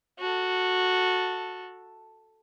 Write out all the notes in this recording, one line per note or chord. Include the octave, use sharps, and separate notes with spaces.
F#4 A4